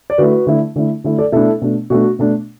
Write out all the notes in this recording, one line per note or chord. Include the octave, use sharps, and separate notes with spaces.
D5
D3 A3 E4 F#4 B4
D3 A3 E4
D3 A3 E4
D3 A3 E4
A4 D5
B2 A3 D4 E4 A4
B2 A3 D4
B2 A3 D4 F#4
B2 A3 D4